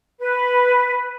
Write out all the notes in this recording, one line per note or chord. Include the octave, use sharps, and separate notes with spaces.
B4